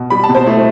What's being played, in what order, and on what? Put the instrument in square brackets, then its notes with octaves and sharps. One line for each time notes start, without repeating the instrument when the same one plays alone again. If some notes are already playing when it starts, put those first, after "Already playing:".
Already playing: [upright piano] B2
G3 B5
A5
B2
C5
A3 E4